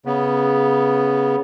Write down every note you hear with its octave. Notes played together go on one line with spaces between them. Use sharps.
C#3 B3